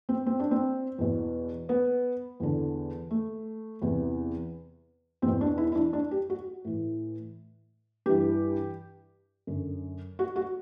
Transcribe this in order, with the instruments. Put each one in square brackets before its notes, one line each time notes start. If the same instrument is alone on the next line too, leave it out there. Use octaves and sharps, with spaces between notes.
[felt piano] C4
C4
D4
C4
E2 B2
B3
E2 D3
A3
E2 C3 E3
E2 C4
B2
D4
E4
E4
D4
D4
G4
F#4
A2 E3
G2 E3 G4
F#2 D3
F#4
F#4